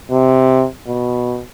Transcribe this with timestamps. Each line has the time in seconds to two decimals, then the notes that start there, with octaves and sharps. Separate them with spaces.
0.11 C3
0.88 B2